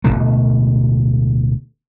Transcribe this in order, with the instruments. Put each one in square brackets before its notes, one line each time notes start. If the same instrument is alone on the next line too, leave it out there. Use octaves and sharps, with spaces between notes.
[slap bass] D1 E2 B2 A3